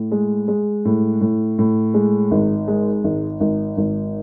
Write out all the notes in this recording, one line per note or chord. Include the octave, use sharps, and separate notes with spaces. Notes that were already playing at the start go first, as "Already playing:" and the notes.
Already playing: A2
G#3
G#3
A2
A2
A2
G#3
G#1
G#3
G#1
G#1
G#1